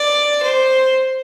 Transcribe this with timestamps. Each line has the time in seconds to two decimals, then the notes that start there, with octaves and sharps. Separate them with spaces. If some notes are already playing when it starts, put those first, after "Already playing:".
Already playing: D5
0.42 C5